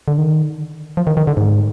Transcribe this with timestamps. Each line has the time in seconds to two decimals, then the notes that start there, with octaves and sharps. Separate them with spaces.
0.08 D3
0.18 D#3
0.97 F3
1.07 D#3
1.17 D#3
1.27 D3
1.37 G#2